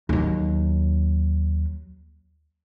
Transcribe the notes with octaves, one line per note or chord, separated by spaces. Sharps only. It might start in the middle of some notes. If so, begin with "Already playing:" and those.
D#2 F#3